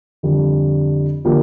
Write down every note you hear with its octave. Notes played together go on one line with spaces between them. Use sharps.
F2 D3 G3
D3 F3 A#3 G4 A#4